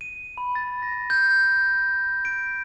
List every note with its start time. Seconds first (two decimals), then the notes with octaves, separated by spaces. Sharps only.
0.01 D#7
0.38 B5
0.55 A6
0.82 A#6
1.10 G6
2.25 D7